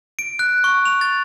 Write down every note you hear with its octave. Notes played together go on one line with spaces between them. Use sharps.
D7
F#6
C#6
F7
A6